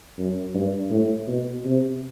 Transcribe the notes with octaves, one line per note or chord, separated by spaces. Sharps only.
F#2
G2
A2
B2
C3